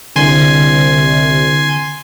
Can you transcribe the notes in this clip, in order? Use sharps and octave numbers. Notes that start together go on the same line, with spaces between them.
C2 D3 G#5 C6